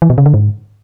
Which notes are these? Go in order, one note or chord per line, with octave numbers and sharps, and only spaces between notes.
E3
B2
C#3
D3
G#2